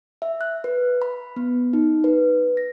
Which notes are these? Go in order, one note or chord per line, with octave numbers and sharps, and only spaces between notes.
E5
F#6
B4
B5
B3
D#4
B4
A#6